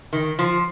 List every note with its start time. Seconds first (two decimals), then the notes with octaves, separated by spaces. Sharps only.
0.13 D#3
0.39 F3